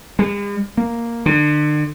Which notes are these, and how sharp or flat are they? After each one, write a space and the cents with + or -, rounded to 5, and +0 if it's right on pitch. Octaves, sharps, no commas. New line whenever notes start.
G#3 -45
A#3 +0
D3 +35